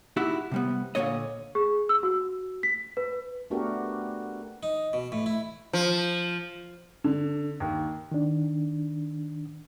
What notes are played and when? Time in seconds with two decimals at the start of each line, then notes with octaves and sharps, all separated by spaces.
0.17 D#4 E4 F#4 G4 E5
0.51 C3 G3 B3
0.95 A#2 D3 D#3 A#3 C#5 D#5
1.55 G#4
1.89 E6
2.03 F#4
2.63 B6
2.97 B4
3.50 A3 B3 D4 F#4 G4 A#4
4.63 D#4
4.93 B2
5.12 A2
5.26 E4
5.73 F3
7.04 D3
7.60 D#2
8.12 D#3 D4